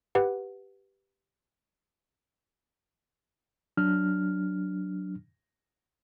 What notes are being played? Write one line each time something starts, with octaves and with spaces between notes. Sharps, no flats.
G4 B4 F#5
F#3 D4 F6